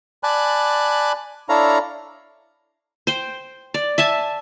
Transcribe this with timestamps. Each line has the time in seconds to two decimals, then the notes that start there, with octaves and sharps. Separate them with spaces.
0.23 D5 G#5 A5 B5 F#6
1.49 D4 E4 A4 C#5 F5 A#5
3.07 C5 G5
3.74 D5
3.98 E5 G#5 A5